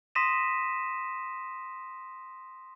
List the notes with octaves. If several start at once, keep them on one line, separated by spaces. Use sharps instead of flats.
C6 D#6 A#6 B6 D#7 E7